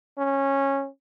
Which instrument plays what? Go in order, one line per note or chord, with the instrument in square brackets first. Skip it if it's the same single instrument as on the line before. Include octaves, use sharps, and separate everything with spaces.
[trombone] C#4